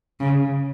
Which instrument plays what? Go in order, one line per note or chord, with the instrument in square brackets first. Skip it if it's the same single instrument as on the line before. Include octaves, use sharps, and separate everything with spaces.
[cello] C#3